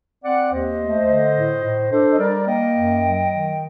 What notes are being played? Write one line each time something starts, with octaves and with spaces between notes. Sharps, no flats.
C4 D5 F#5
D#2 C5 D#5
A3
D3
A2
A2
D4 A4 C5
D#5
G3 A#4 D5
A#3 D#5 G5
F#2
F#3
D#3